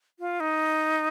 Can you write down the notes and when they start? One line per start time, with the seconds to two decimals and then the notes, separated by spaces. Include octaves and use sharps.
0.19 F4
0.40 D#4